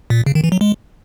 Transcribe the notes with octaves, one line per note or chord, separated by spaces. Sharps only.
A#2
C#3
D#3
E3
F#3
G#3